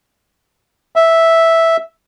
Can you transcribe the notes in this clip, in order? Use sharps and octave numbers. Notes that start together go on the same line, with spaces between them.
E5